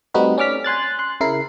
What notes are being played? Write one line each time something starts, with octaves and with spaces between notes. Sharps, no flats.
G3 A3 C4 D#4 F#4 B4
C#4 D5 D6 F6 B6
G#5 C6 F#6 A6
C6 F#6
C#3 E4 A#4 C7